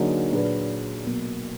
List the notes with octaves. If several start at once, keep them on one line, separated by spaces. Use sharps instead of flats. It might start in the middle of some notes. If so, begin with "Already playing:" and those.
Already playing: D3 F#3 A#3 D#4 G#4
A#2 F#3 D4 G#4 B4
B1 B2 A#3